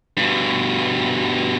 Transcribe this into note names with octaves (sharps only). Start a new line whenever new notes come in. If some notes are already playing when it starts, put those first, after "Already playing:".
G2 B2